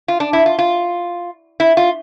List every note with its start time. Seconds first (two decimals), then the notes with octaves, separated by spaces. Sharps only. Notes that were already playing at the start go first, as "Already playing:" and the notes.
0.08 F4
0.20 D4
0.33 E4
0.46 F4
0.59 F4
1.60 E4
1.77 F4